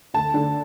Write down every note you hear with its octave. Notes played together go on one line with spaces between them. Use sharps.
D2 A5
D3